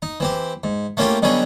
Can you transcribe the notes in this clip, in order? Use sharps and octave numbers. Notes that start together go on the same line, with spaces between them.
D#4
E3 C4 G4
G#2
A3 A#3 C#4 E4 F4 G4
B2 D3 F#3 G3 C#4 G#4